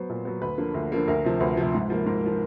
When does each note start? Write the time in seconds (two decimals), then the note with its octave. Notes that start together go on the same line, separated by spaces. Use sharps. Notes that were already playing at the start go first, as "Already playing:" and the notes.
Already playing: F#3 B3 C5
0.09 A#2
0.25 F#3 B3
0.42 D2 B4
0.58 D3 F3 A#3
0.74 D2
0.92 D3 F3 A#3
1.08 D2 A#4
1.25 C3 F3
1.40 D2 B4
1.57 C3 F3
1.74 G#2
1.90 F3 A#3
2.06 G#2 A#4
2.23 F3 A#3